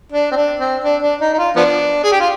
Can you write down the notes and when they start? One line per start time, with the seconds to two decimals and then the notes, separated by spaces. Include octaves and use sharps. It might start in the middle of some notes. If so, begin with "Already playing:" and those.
0.12 D4
0.31 C4
0.36 D4
0.60 C4
0.84 D4
1.02 D4
1.20 D#4
1.33 D#4
1.38 F4
1.56 F3 B3 D4
2.03 G#4
2.11 G4
2.20 F4